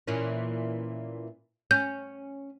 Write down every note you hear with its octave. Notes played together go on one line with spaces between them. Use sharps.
A#2 E3 C#4
C#4 G6